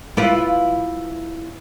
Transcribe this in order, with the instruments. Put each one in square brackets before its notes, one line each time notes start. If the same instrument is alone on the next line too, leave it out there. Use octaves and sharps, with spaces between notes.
[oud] E4 F4 B4